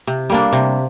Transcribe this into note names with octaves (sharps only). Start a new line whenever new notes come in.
C3
G3 A#3 D4
C3